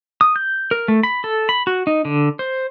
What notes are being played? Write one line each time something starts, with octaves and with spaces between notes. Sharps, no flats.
D#6
G6
A#4
A3
B5
A4
B5
F#4
D#4
D3
C5